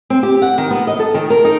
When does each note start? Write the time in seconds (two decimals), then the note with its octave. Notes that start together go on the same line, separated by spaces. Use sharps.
0.10 C4
0.23 G4
0.42 F#5
0.58 D#3
0.71 B3
0.87 D#5
0.99 A4
1.14 D#3
1.30 A#4
1.45 D#4